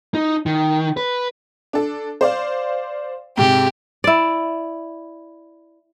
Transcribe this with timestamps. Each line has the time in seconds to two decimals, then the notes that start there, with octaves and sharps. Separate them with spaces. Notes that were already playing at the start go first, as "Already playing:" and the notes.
0.15 D#4
0.46 D#3
0.97 B4
1.73 D4 A4
2.21 C5 D5 F5
3.37 G#2 C3 G#3 G4
4.04 E4 D5